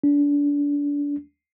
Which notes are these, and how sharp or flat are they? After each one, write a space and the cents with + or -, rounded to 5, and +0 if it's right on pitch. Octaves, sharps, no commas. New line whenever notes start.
D4 -30